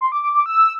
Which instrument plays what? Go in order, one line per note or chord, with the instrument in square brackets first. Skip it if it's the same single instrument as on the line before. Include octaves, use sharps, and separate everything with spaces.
[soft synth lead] C6
D6
D6
D6
E6